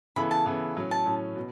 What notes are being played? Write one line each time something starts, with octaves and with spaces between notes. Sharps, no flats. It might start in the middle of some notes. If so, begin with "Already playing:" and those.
C#3 E3 B3 E4 A4 B5
A5
C#3 E3 B3 E4 A4
A2 F#3 C#4
A5
A2 F#3 C#4
B2